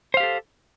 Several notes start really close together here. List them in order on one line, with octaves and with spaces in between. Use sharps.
C5 F5 G4 A4